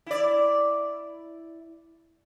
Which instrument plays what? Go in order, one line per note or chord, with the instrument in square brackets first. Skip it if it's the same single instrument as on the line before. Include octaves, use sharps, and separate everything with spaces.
[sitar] E4 D5